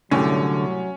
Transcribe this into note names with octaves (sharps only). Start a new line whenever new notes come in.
C2 A2 D3 F#3 C#4 G4